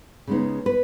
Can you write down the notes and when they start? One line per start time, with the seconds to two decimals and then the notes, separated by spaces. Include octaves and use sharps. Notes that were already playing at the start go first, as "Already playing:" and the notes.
0.27 C#3 G#3 B3 D#4
0.66 B4